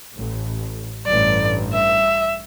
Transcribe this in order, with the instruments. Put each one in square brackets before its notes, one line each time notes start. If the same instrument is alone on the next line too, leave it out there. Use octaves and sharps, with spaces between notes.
[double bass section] A1
[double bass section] A1 G2 [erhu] D5
[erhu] E5